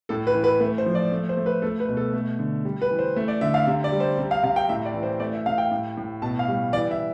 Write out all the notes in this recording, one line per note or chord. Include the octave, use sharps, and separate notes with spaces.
A2 A4
B4
E3
B4
A3 B4
C5
F3
D5
A3
C5
A3
B4
A3 A4
B4
B2
A4
A3
D3
G3
B4
E3
C5
A3
D5
D3 E5
F5
C3 E5
D5
G3
C5
C3
F5
C3 F5
G5
A2 E5
D5
E3
C5
A3 D5
E5
C3 F5
G5
A2
A2
B2 A5
F5
G3
E3 D5
E5